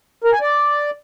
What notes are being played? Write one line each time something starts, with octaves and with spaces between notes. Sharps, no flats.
A#4
G#5
D5